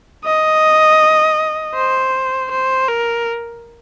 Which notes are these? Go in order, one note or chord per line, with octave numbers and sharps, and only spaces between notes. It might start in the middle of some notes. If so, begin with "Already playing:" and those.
D#5
C5
C5
A#4